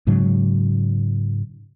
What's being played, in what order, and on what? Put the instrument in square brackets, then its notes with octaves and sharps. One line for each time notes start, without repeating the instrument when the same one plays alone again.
[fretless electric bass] G#2 C#3 F#3